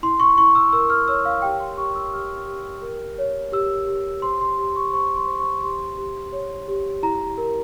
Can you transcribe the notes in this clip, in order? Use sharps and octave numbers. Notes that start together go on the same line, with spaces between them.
E4 C6
C#6
E4 C#6
E6
A#4 E6
F6
C#5 E6
F5
G4 G5
C6
G4 C#6
E6
G4 F6
G4
A#4
C#5
G4 E6
G4
C5 C6
C6
G4 C6
C#6
C5 C#6
C6
C5
C#6
G4 C6
G4
C#5
G4
E4 A#5
A#4